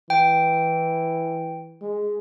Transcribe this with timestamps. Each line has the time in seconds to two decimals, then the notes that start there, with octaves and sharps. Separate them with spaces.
0.10 E3 G5
1.82 G#3